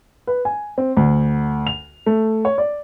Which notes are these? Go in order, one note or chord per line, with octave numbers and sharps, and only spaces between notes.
B4
G#5
C4
D2
F7
A3
C#5
D5